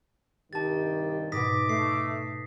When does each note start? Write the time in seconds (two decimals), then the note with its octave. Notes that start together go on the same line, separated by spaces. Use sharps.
0.53 C2 G2 D#3 G4 A5 A6
1.32 G#2 B2 D6 D#6 A#6 B6
1.69 A3 C7